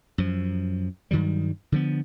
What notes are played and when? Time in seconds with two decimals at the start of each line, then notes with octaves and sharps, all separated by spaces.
0.18 F#2 F3
1.11 G2 D#3 F#3 G3
1.72 D3 F3 B3